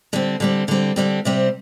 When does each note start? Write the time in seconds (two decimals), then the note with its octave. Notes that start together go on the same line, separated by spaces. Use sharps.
0.13 D3 G3 C4
0.40 D3 G3 C4
0.68 D3 G3 C4
0.96 D3 G3 C4
1.25 C3 G3 C4